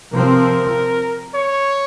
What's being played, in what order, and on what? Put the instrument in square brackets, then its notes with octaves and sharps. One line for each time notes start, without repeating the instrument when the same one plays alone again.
[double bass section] C3 F3 C4 [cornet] A#4
[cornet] C#5